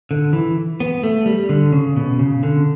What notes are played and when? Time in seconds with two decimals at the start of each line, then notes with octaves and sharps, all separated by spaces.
0.11 D3
0.33 E3
0.80 B3
1.03 A3
1.26 G3
1.49 D3
1.72 C#3
1.96 B2
2.19 C#3
2.43 D3